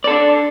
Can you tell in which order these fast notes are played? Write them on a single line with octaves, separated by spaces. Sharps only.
D5 A4 D4